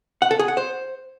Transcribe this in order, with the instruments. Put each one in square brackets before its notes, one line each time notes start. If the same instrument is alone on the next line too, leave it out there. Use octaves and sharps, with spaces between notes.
[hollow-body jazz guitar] F#5
A4
G#4
F#5
C5